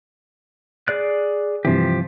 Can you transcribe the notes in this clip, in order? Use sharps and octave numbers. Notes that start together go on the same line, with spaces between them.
G#4 D5 F#6
G2 C3 E3 F3 G4